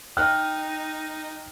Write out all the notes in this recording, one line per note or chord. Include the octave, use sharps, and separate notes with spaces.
D#4 G5 F6 F#6